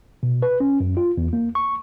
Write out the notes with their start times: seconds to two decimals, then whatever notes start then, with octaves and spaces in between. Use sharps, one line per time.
0.23 B2
0.42 B4
0.60 C#4
0.80 F#2
0.97 F4
1.17 E2
1.33 A#3
1.55 C#6